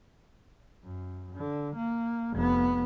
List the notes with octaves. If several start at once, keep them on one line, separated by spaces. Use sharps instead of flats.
F#2
D3
A#3
F1 B3